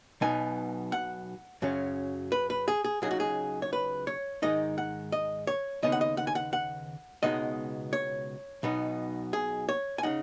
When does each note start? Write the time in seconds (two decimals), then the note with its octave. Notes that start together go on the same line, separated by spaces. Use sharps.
0.21 B1 B2 B3 D#4 G#5
0.92 F#5
1.62 F#2 C#3 F#3 C#4
2.32 B4
2.50 B4
2.68 G#4
2.84 G#4
3.02 C#2 C#3 F#3 D#4 G#4
3.11 F#4
3.20 G#4
3.62 C#5
3.73 B4
4.07 C#5
4.42 G#2 D#3 G#3 D#4 D#5
4.78 F#5
5.12 D#5
5.47 C#5
5.82 D#2 C#3 B3 D#4 D#5
5.92 F#5
6.01 D#5
6.17 F#5
6.27 G#5
6.35 F#5
6.53 F#5
7.23 C#2 B2 G#3 B3 D#4 D#5
7.93 C#5
8.63 B1 B2 B3 D#4
9.33 G#4
9.69 C#5
9.98 G#5
10.03 C#3 F#3 D#4 F#5